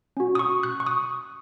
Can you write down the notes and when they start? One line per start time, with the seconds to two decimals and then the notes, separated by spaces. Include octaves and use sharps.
0.17 C#4 F#4
0.35 D#6
0.39 C#6
0.63 F#6
0.80 C#6
0.87 D#6